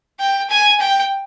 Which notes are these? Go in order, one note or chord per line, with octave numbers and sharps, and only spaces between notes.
G5
G#5
G5